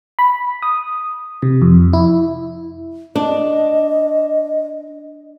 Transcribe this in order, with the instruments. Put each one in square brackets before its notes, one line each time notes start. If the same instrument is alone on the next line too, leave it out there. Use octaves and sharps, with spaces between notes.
[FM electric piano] B5
D#6
C3
F2
E4
[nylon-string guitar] D4 [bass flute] D#5